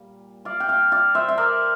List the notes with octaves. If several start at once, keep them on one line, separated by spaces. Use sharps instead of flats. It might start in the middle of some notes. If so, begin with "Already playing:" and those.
Already playing: A#2 G3
D5 F5
G5
D5 F5
D5 F5
C5 E5
E5
A#4 D5